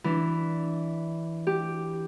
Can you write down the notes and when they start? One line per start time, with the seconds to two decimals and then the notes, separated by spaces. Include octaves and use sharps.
0.04 E3 D4
1.47 G4